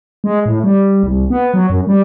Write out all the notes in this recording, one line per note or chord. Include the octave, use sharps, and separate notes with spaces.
G#3
A2
G3
C2
B3
F#3
F#2
G3